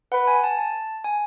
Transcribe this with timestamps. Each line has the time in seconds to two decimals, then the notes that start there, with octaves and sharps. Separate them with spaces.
0.12 B4 F#5
0.27 G#5
0.44 A5
0.59 A5
1.04 G#5